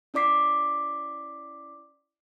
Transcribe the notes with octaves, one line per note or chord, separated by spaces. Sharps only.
C#4 E4 D5 D6 B6 C7